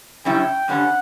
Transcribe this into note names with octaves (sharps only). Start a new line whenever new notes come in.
F#2 C#3 G3 C#4 E4 G5
G2 D3 G3 C#4 F#5